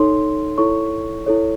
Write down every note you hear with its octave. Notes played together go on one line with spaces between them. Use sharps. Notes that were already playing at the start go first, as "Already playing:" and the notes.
Already playing: D#4 A4 C#5 C6
E4 A4 C#5 C#6
E4 A4 C#5